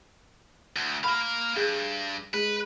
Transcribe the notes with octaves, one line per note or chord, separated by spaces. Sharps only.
D2
A#3 F5 B5
G2 G#4
G#3 B4